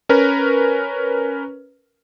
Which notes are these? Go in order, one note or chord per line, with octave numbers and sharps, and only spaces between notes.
C#4 A#4 B4